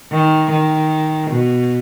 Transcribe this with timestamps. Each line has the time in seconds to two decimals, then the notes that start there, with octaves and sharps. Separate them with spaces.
0.12 D#3
0.52 D#3
1.30 B2